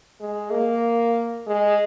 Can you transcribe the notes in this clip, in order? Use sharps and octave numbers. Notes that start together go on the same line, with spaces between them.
G#3
A#3
G#3